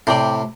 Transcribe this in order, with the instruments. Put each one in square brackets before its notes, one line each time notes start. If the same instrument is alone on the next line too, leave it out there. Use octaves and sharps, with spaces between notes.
[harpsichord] A2 C3 [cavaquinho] D5 G5 C6